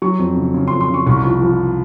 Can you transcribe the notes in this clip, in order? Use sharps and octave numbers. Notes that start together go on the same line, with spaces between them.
F#3 C#6
F2
C#3
C#3
F2 C6
C6
C#3 C#6
C2 C#6
F3
F3